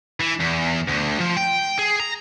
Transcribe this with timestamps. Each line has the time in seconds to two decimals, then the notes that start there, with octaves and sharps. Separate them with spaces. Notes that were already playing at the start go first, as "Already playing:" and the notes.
0.20 E3
0.40 E2
0.88 D2
1.20 F3
1.37 G5
1.79 G#4
2.00 A#5